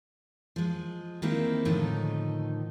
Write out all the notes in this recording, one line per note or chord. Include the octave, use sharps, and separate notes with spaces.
F3 G#3
D#3 G#3 A#3 C4 E4
A2 D3 D#3 F3 D#4